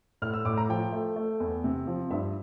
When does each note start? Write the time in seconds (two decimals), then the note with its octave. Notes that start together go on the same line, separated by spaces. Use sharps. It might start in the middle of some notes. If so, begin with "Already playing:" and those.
0.22 A2 F6
0.34 E6
0.45 A2 D6
0.58 A#5
0.69 F3 G5
0.93 A3
1.16 A3
1.40 E2
1.64 C3
1.87 F3
2.11 G2 E5